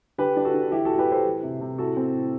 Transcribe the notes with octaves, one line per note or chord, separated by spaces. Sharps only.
D3 G4 B4
D4
F#4 A4
D3
E3 E4 G4
A2 F#4 A4
G4 B4
A2 A4 C5
E3
C3
C3
A2 F#4 A4
C4
A2